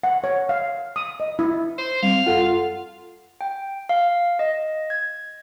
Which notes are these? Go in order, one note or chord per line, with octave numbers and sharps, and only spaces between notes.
F#5
C#5
F5
D#6
D#5
E4
C5
G3 C4 F5
F#2 F4 A4 F#5
G5
F5
D#5
G#6